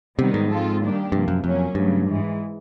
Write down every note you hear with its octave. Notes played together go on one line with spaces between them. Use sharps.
C3 D#3 G3 B3 D#4
G#2
F3 G#3 C4 F4 A4
D#3 G3 A#3 D4 G4
G2 C3 F3 A#3
F#2
F2 F#3 A#3 C#4
G2 C#3 F#3 A3
G#2 E3 G#3